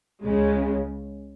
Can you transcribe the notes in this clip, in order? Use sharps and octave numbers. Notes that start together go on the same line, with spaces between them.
C#2 C#3 G#3